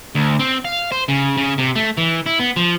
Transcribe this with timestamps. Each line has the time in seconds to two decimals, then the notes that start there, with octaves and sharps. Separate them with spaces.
0.15 D2
0.39 C4
0.65 F5
0.92 C5
1.09 C#3
1.37 C#3
1.58 C3
1.76 A3
1.98 E3
2.26 E4
2.39 B3
2.57 F3